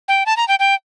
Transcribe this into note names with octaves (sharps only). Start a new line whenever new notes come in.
G5
A5
A#5
G5
G5